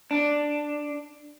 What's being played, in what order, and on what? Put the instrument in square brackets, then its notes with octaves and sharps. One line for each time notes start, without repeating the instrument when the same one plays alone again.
[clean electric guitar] D4